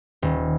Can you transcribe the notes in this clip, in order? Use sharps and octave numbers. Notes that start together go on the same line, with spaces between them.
D#1